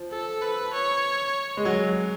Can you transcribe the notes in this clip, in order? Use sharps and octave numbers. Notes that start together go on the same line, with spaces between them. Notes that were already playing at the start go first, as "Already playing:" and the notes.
Already playing: F3
A4
B4
C#5
G#3
F#3